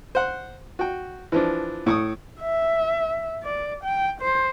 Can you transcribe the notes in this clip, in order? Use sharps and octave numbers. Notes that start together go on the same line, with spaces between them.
C5 F#5
F#4 G5
E3 F3 D4
A2 C#6 D#6
E5
D5
G5
C5